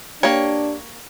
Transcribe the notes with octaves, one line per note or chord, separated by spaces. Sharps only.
A#3 D4 G4 C#5